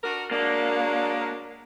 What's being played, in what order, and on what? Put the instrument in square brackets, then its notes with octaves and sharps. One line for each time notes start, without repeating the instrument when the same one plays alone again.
[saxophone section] D4 F#4 A#4
[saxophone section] F#3 G#3 D4 [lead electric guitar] A#3